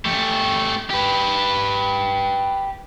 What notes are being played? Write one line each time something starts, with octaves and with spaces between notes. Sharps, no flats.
A3 G4
G4 B4